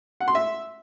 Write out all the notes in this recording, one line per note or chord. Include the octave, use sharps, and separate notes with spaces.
F#5
C6
E5